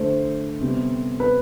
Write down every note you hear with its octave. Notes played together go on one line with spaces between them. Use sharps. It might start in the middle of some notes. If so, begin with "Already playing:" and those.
Already playing: D3 A3 C5
C3 G3 B3
B4